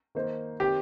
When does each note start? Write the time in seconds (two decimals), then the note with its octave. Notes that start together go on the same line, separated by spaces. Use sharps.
0.15 D#3 A#3 D#4 C5
0.60 D#3 C4 G4